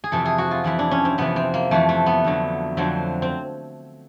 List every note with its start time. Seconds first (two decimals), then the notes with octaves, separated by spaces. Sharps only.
0.04 G#4
0.12 F2 C3 E3 A4
0.25 G#4
0.38 F#4
0.51 F4
0.64 F2 C3 E3 E4
0.79 D4
0.91 C#4
1.05 C4
1.18 F2 C3 E3 B3
1.36 C4
1.54 A#3
1.71 F2 C3 E3 A3
1.89 A3
2.06 B3
2.24 F2 D3 F#3
2.77 F2 D3 F#3 C4
3.22 C4